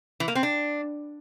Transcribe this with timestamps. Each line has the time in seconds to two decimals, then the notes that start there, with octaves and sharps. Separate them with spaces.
0.20 E3
0.28 A#3
0.35 C4
0.43 D4